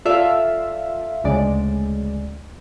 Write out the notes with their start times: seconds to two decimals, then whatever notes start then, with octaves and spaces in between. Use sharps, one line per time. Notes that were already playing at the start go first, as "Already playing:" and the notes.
0.05 F4 A4 D5 E5 F5
1.24 D2 C#3 G#3 D5